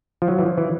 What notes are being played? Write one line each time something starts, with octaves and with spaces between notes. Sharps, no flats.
F3
F#3
E3
F3
E3